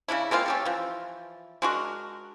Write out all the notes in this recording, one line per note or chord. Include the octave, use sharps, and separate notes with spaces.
C#3 C#4 D4 E4
G#3 A#3 C4 F4
C#4 G4 A4
E3 F3
G#3 D4 F#4 A#4